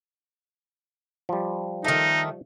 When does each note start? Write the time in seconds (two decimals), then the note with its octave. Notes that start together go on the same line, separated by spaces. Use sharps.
1.29 F3 G3
1.84 D#3 A3 D#4